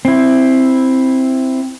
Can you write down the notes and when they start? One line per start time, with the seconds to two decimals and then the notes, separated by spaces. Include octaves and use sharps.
0.05 C4 E4